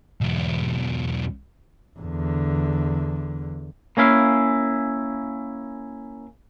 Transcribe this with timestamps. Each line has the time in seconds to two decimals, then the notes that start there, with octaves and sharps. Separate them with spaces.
0.21 B1 E2
2.00 E2 D3
3.97 A#3 C#4 E4 F5